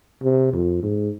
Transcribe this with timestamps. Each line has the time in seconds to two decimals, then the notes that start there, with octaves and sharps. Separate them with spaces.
0.23 C3
0.53 F2
0.83 G#2